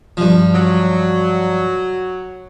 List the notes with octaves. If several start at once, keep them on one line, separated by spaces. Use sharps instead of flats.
G2 F3
F#3